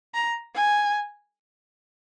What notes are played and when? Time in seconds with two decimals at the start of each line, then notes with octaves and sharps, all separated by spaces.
0.14 A#5
0.56 G#5